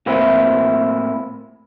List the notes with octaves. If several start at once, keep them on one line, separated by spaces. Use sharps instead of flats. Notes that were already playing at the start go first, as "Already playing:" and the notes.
A2 A#3 C4 E4